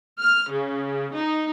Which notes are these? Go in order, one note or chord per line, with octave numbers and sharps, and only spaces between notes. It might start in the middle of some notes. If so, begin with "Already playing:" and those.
F6
C#3
D#4